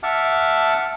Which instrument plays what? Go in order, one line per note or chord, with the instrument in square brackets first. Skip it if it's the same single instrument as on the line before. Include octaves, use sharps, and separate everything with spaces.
[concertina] E5 F#5 A5 D6 F6